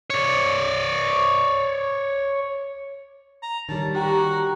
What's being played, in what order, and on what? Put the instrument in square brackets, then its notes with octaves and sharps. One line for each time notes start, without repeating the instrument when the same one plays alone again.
[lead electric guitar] C#5 D5
[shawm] A#5
[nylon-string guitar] D#3 G3 [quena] C#5 [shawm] A5
[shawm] F#4 [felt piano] G4 [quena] A#5